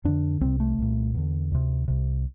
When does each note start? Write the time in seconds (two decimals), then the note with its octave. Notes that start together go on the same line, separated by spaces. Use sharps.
0.05 F2 D3 D4
0.41 C2 C3 C4
0.60 A3
0.78 C2 A#2
1.14 E2 D3
1.52 D2 C3
1.88 C2 C3